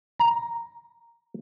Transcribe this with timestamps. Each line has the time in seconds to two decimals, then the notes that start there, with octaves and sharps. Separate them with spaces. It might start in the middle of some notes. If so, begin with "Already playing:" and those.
0.19 A#5